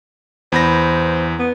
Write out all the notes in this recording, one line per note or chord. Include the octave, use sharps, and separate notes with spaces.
E2 C5 B5 A#6
B3